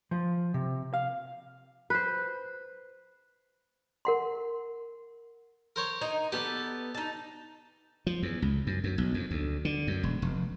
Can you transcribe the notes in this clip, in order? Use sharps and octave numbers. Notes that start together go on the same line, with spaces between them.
F3
C3
F5
B4 C5
A#4 F#5 C6
A#4 C5 C#5
D#4
B3 G4 A4 D5
D#4 A5
F3
E2
C#2
F#2
F#2
B1
F2
D2
D3
F#2
E1
F1